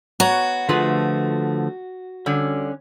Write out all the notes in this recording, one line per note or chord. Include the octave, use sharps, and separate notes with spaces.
B3 F#4 C#5 A#5
D3 F3 A3 F4 G#4 B4
D3 G3 C#4